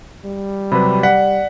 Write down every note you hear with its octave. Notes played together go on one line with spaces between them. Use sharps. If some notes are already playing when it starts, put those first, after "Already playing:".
G3
C3 F#3 B4 B5
D5 F#5 B6